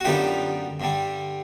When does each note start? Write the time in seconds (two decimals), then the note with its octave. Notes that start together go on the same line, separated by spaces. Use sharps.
0.01 F#4
0.04 F#2 D3 G3 B3 D#4 F4 G4
0.80 G2 D3 G3